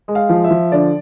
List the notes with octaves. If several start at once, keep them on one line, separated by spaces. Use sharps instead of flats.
G#3
F5
F3
E5
F3
D3 D5